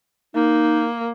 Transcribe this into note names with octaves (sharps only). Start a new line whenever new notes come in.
A#3 D#4